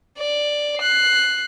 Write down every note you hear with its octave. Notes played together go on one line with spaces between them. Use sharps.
D5
F#6 C7